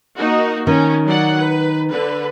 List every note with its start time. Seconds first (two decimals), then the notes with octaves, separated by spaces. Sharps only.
0.16 A#3 D#4 F#4
0.67 D#3 C#4
1.04 F#3 D5 F#5
1.37 B4
1.89 D3 B4